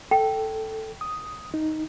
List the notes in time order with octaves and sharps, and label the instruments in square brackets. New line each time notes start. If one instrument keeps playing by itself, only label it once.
[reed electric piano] A4 [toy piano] G5
[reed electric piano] D#6
D#4